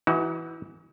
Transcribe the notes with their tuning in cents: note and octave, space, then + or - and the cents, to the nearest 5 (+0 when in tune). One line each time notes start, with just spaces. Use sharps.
E3 +0 D#4 +35 F#4 +20